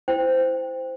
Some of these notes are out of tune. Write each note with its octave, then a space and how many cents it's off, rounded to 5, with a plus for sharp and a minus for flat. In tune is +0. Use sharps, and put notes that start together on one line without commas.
E4 +0 C5 -10 G5 +10